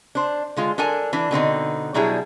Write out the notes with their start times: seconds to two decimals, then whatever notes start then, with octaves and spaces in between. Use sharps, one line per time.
0.15 D4 C5
0.56 D3 G#3 F4
0.78 D4 A4 A#4 G#5
1.13 E3 D4
1.31 B2 D3 C4 D#4
1.94 B2 F#3 G3 D4 E4 G#4